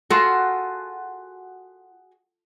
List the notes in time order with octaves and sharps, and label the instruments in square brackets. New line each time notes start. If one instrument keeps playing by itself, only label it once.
[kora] F4 A4 [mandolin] F#4 G#4